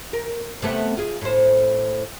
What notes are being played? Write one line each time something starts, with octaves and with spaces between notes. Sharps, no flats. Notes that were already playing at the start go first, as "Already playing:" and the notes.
A#4
C3 A3 B3
F4 G#4
A2 C5